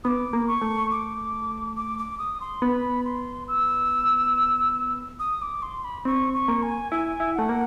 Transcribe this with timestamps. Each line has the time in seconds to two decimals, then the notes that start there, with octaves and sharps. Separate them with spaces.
0.04 B3 D6 D#6
0.33 A#3
0.48 C#6
0.61 A3
0.91 D6
1.76 D6
1.98 D6
2.19 D#6
2.41 C6
2.62 B3 B5
3.05 C6
3.48 E6
5.19 D#6
5.42 D6
5.63 C6
5.84 B5
6.05 C4 C#6
6.34 C#6
6.48 A#3
6.63 G#5
6.92 E4 G#5
7.20 E4
7.35 A3 F#5
7.49 A#3